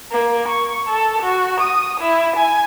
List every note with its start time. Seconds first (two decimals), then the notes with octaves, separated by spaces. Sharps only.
0.10 A#3
0.47 C#6
0.87 A4
1.21 F#4
1.59 D#6
1.99 E4
2.36 G#5